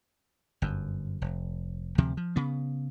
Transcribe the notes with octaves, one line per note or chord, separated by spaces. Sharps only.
G1 F#2
F1
D2 C3 F3
F3
C#3 B3